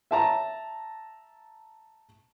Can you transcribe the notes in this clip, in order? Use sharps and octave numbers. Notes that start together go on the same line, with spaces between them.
E5 A5 A#5